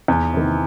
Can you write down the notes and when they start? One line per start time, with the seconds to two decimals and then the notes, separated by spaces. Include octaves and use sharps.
0.08 E2
0.33 C3 D#3